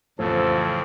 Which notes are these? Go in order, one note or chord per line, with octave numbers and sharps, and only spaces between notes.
A1 F2 C#3 F3 A4 C5